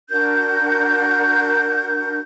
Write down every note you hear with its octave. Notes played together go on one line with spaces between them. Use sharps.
D4 F#4 A#4 G6